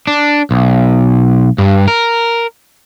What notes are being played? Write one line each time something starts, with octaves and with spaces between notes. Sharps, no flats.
D4
B1
G2
A#4